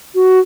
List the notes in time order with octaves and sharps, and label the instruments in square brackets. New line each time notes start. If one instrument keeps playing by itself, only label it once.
[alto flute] F#4